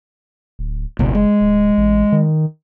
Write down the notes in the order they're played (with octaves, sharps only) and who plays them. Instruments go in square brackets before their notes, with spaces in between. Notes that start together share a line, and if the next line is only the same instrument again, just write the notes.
[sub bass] D1
[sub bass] F#1 [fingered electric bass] C#2 B2
[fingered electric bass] G#3
[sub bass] D1
A1
D#3